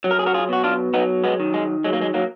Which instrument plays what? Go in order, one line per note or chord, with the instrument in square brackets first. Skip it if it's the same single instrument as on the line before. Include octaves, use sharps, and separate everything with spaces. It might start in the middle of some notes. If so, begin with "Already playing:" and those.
[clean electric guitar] F#3
A#4
G#4
F#4 A#4
F4 G#4
B2 F#4
D4 F4
F#3 B3 D#4
G#3 B3
D#3
G#3
F#3 G#3
A#3
G#3
F#3 A#3